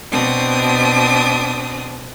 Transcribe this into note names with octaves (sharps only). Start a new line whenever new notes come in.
B2 C4 D4 D#6